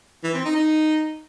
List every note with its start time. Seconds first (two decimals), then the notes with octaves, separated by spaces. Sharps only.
0.24 E3
0.34 C4
0.45 D#4
0.56 D#4